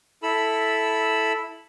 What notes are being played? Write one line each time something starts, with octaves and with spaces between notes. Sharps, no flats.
E4 A4 B5 E6